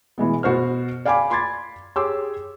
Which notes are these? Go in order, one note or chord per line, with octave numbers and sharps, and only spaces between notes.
B2 E3 G#3 B3
B2 F#4 C5 F6
D5 F5 G5 G#5 B5 D6
B5 C6 D6 G#6 A6
G4 G#4 C#5 C6 D6 E6